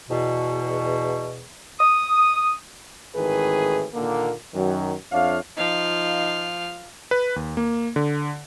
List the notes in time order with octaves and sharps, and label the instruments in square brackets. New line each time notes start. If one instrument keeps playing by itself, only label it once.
[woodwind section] E2 B2
D#6
[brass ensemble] G#1 A2 D#3 E3 G#4 B4
A#2 D3 D#3 A#3
F#2 D#3 F#3
F2 D4 C#5 E5 F5
[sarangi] F3 [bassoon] D#4 [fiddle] F5
[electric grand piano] B4
D#2
A#3
D3